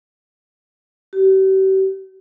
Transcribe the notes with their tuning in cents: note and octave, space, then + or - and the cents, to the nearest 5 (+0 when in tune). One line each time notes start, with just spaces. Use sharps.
G4 -40